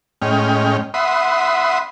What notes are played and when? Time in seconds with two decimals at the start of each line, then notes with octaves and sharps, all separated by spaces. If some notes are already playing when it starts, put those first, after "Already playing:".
0.22 A2 G#3 C#4 D#5 G5 F6
0.94 E5 F#5 B5 C6 D#6